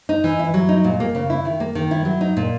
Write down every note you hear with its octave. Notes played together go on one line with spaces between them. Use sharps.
D#4
E3
E4
F#3
D#4
A#2
A#3
C#3
E4
D#3
A#3
D#3
E4
F#3
D#4
A#2